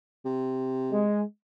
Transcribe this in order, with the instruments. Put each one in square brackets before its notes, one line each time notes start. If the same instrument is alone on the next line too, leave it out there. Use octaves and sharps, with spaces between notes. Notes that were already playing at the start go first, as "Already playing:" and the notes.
[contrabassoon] C3
[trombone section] G#3